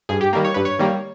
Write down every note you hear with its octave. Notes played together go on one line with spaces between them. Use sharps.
G2 G#4
G4
D#3 G3 A#3
C#5
G2 B4
C#5
D#3 G3 A#3